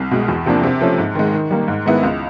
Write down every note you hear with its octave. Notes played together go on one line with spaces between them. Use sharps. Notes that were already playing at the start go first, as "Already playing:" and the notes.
Already playing: C2
B2 G#3
E2
C3 F3 A#3 D4
C3
F3 A3 C#4
G#2
D#3 G#3
D#3
G3 A#3
G#2
D#3 G#3 B3 E4
C#2